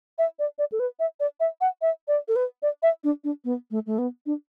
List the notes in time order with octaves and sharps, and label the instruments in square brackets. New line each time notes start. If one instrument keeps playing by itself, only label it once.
[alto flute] E5
D5
D5
A4
B4
E5
D5
E5
F#5
E5
D5
A4
B4
D5
E5
D4
D4
B3
A3
A3
B3
D4